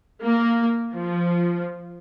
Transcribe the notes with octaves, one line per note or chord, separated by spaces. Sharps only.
A#3
F3